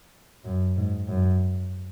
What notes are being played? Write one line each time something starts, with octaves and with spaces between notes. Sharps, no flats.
F#2
G#2
F#2